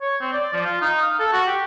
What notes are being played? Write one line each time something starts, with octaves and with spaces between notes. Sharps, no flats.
C#5
C4
D5
F3
F4
D#4
F5
A4
F#4
G4